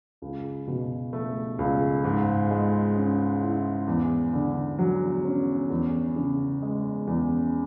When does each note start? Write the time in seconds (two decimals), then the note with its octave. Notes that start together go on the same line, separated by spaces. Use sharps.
0.22 C#2
0.67 B2
1.13 A3
1.59 C#2
2.04 G#2
2.51 G#3
2.96 C#4
3.42 E4
3.88 E2
4.33 D3
4.79 F#3
5.25 C#4
5.70 E2
6.16 C#3
6.62 G#3
7.07 E2